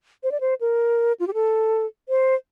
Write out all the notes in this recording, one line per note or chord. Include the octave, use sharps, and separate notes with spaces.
C5
D5
C5
A#4
F4
G4
A4
C5